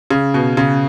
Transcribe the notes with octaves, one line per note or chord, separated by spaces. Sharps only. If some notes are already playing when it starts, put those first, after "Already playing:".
C#3
B2
C#3